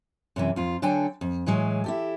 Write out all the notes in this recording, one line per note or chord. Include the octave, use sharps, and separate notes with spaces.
F#2 C3 E3
F2 F4
D3 F#3 D4 A4 G5 G#5
F2
A2 E3 F#3 G#3
E4 G4 A4